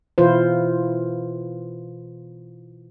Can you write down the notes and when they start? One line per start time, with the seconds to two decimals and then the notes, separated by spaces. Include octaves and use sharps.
0.18 B2 E3 E4 F4 B4 C5